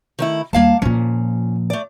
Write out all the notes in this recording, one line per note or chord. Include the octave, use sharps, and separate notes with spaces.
D#3 A3 E4
D#2 G3 A#3 F5 A5
A#2 F3 C#4
A3 D5